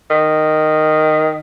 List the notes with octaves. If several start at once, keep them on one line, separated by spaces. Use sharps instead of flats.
D#3